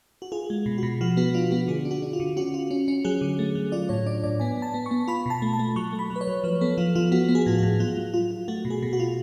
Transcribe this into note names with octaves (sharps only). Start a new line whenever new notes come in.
F#4
F4 G#4
G#3
B2
B2 F#4
F3 F#4
B3 F#4
D4 F4
B3 F#4
D3 G#4
D4
F#4
D4
F4
D3
C#4 F#4
F4
C#4
C#4
F#3 G#4
D3
A3
F#3
F4 D5
A2 C#5
D4 D5
A2 D5
B3 G#5
B3 A5
B3
C#6
B3
F4 B5
B2 A5
A3
A5
A3
F#3 C#6
A3
B5
F#3
B4
C#5
F#3
F3 B4
B3 A4
F3 F4
F3 F4
B3 F#4
B3
G#4
A2 F4
A2 F#4
F#3 F4
F#3
F4
F4
A3 F#4
B2
G#4
B2
F#4
F4